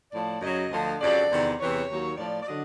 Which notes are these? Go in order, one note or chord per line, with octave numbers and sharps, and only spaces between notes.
A2 F3 D5
F#2 C#3 F#3 D#5
D2 D3 F3
F2 C#3 F#3 D5
E2 C3 D#3
E2 C3 E3 C#5
D#2 D#3 F#3
A2 F3 D5
D5
D3 F#3 D#5